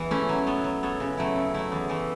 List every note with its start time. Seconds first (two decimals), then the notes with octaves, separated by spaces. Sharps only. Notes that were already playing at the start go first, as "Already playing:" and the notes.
Already playing: E2 E3 B4
0.11 A3 C#4 E4 C#5
0.29 F#3
0.47 B3 A4 C#5
0.64 F#3
0.83 B3 A4 C#5
1.00 C#3
1.18 F#3 A3 E4
1.36 C#3
1.54 F#3 A3 E4
1.72 E2
1.89 E3 A3